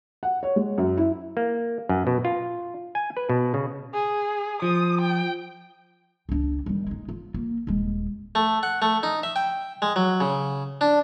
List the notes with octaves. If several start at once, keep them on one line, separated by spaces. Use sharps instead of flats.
F#5
C#5
G#3
F#2
E4
A#3
F#2
B2
F4
G#5
B4
B2
C#3
G#4
F3 D#6
G5
C#2 D4
D#3 G3
G#3 D#4
F4
A#3
D#1 G#3
A3
F#5
A3
D#4
E5
G5
G#3
F#3
C#3
D4